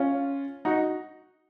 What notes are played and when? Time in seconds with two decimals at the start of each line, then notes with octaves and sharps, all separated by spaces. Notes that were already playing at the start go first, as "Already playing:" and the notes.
Already playing: C#4 F4
0.65 D#4 F#4